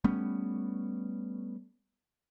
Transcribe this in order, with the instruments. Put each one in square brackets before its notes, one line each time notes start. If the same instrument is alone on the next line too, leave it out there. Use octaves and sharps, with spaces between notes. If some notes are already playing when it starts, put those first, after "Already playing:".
[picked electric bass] G3 A3 B3 C#4